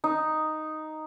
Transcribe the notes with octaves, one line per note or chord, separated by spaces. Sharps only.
D#4